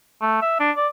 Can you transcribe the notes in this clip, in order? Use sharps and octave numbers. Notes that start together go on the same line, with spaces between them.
A3
E5
D4
D5